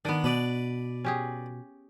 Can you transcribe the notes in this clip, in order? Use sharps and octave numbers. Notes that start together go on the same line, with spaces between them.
D#3 B3 D4
B2 B4 D5
C#4 G4 G#4